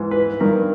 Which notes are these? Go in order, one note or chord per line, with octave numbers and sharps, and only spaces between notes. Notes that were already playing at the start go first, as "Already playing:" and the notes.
Already playing: G#2 E3
B4
G2 D#3 A#4